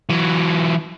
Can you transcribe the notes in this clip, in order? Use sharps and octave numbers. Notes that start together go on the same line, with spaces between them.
E3 F#3